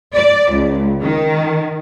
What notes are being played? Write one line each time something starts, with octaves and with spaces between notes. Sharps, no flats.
D5
C#2
D#3